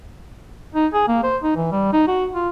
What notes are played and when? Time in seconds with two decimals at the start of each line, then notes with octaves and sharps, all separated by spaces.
0.75 D#4
0.94 G#4
1.08 A#3
1.23 C5
1.43 D#4
1.56 E3
1.72 G3
1.93 D#4
2.08 F#4
2.33 F4